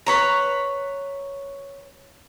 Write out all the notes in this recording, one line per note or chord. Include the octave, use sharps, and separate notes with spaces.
B4 C#5 A#5